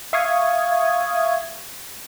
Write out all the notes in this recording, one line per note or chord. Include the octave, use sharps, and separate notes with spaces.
E5 F5 C#6 D#6 G#6